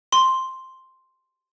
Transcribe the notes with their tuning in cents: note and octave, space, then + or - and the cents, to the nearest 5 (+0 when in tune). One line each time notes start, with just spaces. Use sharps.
C6 +0